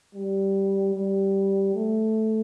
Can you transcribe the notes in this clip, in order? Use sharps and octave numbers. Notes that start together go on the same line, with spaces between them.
G3
G3
A3